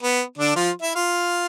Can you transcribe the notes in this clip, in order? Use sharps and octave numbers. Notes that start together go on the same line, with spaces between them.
B3
D3 D4
F3 F4
E4 E5
F4 F5